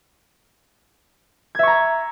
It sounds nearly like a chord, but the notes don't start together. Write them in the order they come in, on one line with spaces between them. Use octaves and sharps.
G#6 E5 C#6 A#5